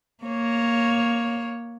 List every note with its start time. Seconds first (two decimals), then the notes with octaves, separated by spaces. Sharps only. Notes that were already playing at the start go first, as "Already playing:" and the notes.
0.24 A#3 C#5